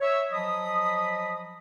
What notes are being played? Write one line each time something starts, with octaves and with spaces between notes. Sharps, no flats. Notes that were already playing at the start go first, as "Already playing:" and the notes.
C#5 E5
F3 F#3 D#5 B5 D#6